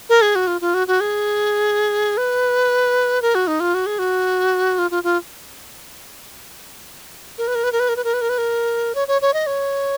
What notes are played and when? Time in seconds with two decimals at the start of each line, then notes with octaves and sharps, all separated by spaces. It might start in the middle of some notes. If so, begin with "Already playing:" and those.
0.09 A#4
0.22 G#4
0.35 F#4
0.47 F4
0.61 F4
0.74 F#4
0.88 F#4
1.00 G#4
2.17 B4
3.22 A#4
3.35 F#4
3.47 D#4
3.60 F4
3.74 F#4
3.86 G#4
3.99 F#4
4.79 F4
4.91 F4
5.04 F4
7.38 A#4
7.48 B4
7.55 A#4
7.64 B4
7.72 A#4
7.80 B4
7.89 A#4
7.96 B4
8.04 A#4
8.14 B4
8.21 A#4
8.29 B4
8.38 A#4
8.95 C#5
9.08 C#5
9.22 C#5
9.34 D#5
9.47 C#5